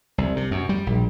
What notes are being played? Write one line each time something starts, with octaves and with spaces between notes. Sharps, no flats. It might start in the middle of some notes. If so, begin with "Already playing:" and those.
C2
C3
F#2
G3
A#1